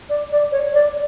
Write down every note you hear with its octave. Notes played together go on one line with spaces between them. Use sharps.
D5
D5
C#5
D5